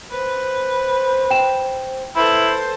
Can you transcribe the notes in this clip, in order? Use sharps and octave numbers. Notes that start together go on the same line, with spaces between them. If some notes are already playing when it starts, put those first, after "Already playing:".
B4 C5
G5 E7
E4 A4 B4 C5